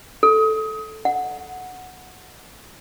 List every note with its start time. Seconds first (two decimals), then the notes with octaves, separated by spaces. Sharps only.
0.23 A4
1.05 F#5